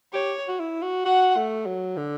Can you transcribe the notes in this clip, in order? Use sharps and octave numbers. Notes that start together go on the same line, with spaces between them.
G4 C#5
F#4
E4
F#4
F#4 F#5
A3
F#3
D3